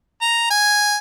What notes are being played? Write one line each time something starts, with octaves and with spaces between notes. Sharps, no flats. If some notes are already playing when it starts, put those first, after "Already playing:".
A#5
G#5